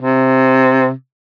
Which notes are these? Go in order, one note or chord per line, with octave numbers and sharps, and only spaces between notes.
C3